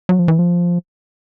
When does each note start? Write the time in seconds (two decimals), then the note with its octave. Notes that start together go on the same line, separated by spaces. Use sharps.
0.09 F#3
0.19 F3
0.28 E3
0.39 F3